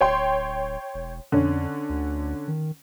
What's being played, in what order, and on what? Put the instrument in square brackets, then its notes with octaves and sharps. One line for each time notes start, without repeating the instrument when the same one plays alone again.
[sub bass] D1 [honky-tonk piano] C#5 G5 C6
[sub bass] E1
[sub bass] F2 [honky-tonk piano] D3 C#4
[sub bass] D2
D#3